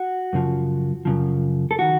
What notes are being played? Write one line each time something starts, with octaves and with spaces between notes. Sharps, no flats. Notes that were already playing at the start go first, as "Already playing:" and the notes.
Already playing: F#4
F#2 C#3 F3
F#2 C#3 F3
A4
D#3 F#4